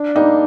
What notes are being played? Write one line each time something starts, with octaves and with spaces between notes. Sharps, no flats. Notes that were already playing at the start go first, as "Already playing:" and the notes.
Already playing: D4
G3 A#3 D#4